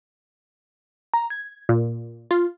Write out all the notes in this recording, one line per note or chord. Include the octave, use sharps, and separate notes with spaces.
A#5
G#6
A#2
F4